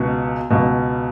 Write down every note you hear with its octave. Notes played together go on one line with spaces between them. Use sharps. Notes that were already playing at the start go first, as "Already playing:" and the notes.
Already playing: C#2 B2
C#2 B2